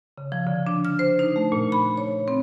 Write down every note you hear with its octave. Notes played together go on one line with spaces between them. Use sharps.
C#3
F3
D3
D4
F6
C5
D#4
A3
A#2
B5
C#5
C4